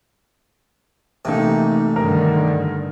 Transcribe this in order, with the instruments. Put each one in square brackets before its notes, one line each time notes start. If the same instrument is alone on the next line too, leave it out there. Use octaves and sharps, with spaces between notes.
[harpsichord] A1 C3 [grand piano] A3 A#3 D#4
[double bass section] G2 D3 D#3 [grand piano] A#4